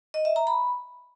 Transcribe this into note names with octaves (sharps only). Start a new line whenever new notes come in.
D#5
E5
A#5
B5